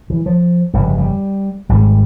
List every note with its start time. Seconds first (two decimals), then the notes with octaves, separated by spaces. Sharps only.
0.10 E3
0.26 F3
0.74 G1 F2 C#3 G3
0.98 G3
1.69 G#1 G#2 G3